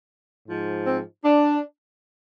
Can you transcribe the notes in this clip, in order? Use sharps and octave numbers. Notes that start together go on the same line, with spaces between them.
G#2 F3
C4
D4